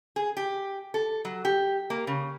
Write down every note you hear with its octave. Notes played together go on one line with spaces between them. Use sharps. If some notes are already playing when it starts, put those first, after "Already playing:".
G#4
G4
A4
F#3
G4
A#3
C#3